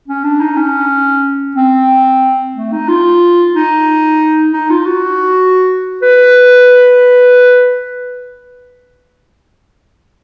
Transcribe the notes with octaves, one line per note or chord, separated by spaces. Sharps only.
C#4
D4
D#4
C#4
C4
A3
D#4
F4
D#4
D#4
F4
F#4
B4